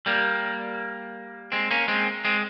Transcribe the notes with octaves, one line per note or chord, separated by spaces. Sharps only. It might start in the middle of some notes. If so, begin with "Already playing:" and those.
G3 A#3
G#3 C4
A#3 C#4
G#3 C4
G#3 C4